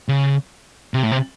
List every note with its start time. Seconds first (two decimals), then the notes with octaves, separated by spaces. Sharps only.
0.08 C#3
0.94 C3
1.03 A2
1.12 C3